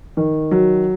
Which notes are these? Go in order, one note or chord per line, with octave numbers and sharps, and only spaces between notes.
D#3
F#3